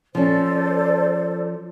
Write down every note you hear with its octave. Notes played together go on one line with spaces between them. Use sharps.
F3 C#4 A4 C5 D5